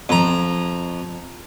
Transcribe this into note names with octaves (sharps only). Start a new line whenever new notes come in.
F2 A#5